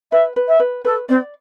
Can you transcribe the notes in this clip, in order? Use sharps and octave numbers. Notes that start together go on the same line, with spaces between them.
B4 E5
B4
E5
B4
A4 B4
C4 D5